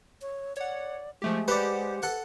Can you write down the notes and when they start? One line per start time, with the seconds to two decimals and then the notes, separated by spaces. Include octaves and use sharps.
0.22 C#5
0.57 C#5 D5 F#5
1.22 F3 G#3 A3 G4
1.48 G4 B4 C5 D5 F#5
2.03 A4 B4 F#5